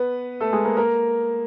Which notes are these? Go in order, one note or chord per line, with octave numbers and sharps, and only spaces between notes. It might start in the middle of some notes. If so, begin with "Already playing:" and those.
Already playing: B3 B4
A3 A4
G#3 G#4
A#3 A#4
A#3 A#4